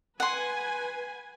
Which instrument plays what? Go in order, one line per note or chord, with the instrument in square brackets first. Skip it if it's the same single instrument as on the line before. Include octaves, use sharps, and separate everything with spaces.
[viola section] B4 G#5 [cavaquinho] F#5 C6